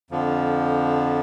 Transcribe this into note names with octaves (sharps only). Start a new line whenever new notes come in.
F2 D3 F3